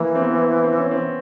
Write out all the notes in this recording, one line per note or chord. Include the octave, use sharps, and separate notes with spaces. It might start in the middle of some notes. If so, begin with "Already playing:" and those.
Already playing: E3 A#3
C4
B3
C4
C#4
C4